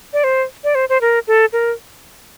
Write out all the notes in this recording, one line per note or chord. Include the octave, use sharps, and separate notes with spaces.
D5
C5
D5
C5
C5
A#4
A4
A#4